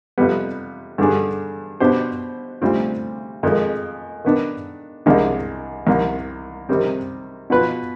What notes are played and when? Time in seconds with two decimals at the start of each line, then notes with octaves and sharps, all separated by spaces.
0.18 F2 C3 G3 B3
0.98 G2 D3 G3 D4 G#4
1.80 B2 B3 D4 G4 C5
2.62 D2 C3 G3 C4 F4
3.43 F2 D#3 G#3
4.25 D#3 B3 D4
5.06 C2 C3 D#3 G#3 D4
5.87 C2 C3 D#3
6.69 C3 D#3 G3 C4
7.50 B2 B3 F4 B4